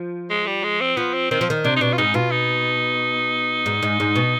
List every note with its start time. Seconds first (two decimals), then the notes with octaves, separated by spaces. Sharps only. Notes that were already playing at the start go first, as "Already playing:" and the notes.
Already playing: F3
0.30 G#3
0.47 G3
0.64 G#3
0.81 C4
0.97 F3 B3
1.14 C4
1.31 D#3 C4
1.41 F3
1.50 D#3
1.64 C3 D4
1.77 D#4
1.81 B2 D4
1.93 F4
1.98 G#2 D#4
2.14 B2 F4
2.31 D#4
3.66 G#2
3.83 G#2
4.00 G#2
4.16 B2